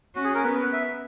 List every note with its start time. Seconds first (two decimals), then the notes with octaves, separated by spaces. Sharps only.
0.15 C#4 F#4
0.24 G#4
0.34 A#4
0.44 B3 B4
0.73 E5